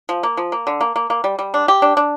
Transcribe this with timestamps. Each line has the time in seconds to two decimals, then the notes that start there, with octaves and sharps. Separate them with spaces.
0.09 F3
0.23 A#3
0.37 F3
0.52 A#3
0.67 D3
0.81 A#3
0.96 A#3
1.10 A#3
1.24 G3
1.39 G3
1.54 D4
1.68 G4
1.82 D4
1.97 D4